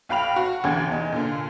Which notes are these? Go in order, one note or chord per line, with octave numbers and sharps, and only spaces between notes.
B1 F5 G5 B5 F7
F#4
A1 E2 D3 G5 G#6
E2 D#4
A#2 D3